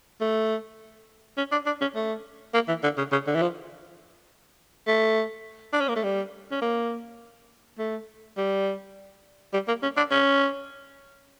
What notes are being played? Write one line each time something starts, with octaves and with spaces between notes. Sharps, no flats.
A3
C#4
D4
D4
C#4
A3
A#3
E3
D3
C#3
C#3
D3
E3
F3
A3
D4
C#4
A#3
A3
G3
C#4
A#3
A3
G3
G3
A#3
C#4
D4
C#4